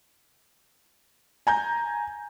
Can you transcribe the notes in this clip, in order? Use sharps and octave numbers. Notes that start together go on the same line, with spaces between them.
G#5 A#5 G6